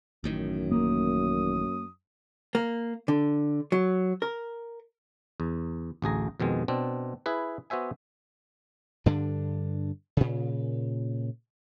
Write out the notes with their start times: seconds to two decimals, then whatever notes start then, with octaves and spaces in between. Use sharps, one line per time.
0.24 A1 F#2 A2 D#3
0.72 A#3 D#6
2.55 A#3
3.08 D3
3.72 F#3
4.22 A#4
5.40 E2
6.02 A1 D2 G#4 A#5
6.40 F2 B2 D#3 G#3
6.68 B2 C4 D4
7.26 E4 G#4 B4
7.70 B3 F#4 C5 E5 G#5
9.06 G2 D3 D4
10.17 A#2 C#3